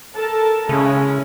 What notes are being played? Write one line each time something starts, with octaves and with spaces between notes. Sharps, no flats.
A4 A#4 A5
C#3 G#3 C#4 E4